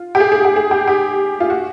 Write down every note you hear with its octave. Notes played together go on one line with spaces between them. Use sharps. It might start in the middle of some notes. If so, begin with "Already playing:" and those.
Already playing: F4
G4
G#4
G#4
G4
G#4
G4
G4
F4
F#4